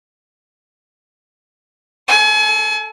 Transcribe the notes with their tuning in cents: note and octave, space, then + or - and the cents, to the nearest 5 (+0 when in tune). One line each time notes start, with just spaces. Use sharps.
A4 +0 G#5 +35